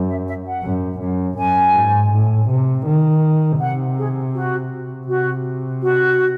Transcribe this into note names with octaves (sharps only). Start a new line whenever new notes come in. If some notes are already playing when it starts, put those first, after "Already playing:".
Already playing: F#2
E5
E5
F#5
F#2
F#2
F#2 G#5
G#2
A2
C3
D#3
C3 F#5
G#4
F#4
C3 F#4
F#4